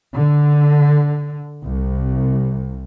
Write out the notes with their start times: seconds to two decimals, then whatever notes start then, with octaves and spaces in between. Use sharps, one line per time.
0.14 D3
1.61 C2